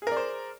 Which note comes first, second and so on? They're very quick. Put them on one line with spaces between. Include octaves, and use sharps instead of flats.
G#4 A#4 D5 C5